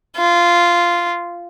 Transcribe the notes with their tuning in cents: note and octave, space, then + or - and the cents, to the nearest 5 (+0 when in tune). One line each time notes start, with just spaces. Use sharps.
F4 -10